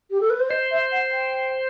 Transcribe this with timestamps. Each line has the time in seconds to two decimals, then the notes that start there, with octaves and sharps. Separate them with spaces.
0.11 G4
0.21 A4
0.30 B4
0.40 C5
0.50 C5 D#5
0.71 E5
0.92 F#5
1.12 G5